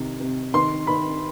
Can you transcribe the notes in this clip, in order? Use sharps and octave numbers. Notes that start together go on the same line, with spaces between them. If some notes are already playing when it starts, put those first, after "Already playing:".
Already playing: C3 D#3
C3
D#3 C6
D#3 B5